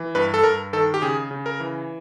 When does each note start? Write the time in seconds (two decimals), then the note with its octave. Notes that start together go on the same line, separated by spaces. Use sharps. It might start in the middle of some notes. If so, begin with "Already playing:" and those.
Already playing: E3
0.15 G2 B4
0.34 A4
0.44 G2 A#4
0.73 D#3 A4
0.94 G4
1.02 C#3 G#4
1.31 C#3
1.46 A#4
1.60 E3